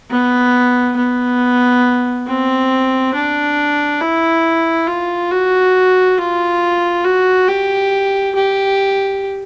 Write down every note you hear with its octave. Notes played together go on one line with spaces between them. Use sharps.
B3
B3
C4
D4
E4
F4
F#4
F4
F#4
G4
G4